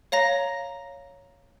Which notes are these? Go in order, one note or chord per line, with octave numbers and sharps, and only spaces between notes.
C#5 F5 A#5 A#6